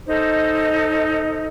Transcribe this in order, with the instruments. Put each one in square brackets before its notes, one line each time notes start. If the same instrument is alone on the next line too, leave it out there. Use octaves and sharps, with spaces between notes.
[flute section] D#4 A4 C5 D#5